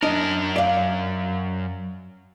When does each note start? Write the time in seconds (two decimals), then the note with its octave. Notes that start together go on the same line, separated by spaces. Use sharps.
0.03 F#2 D4 A#4 D#5
0.56 D5 F5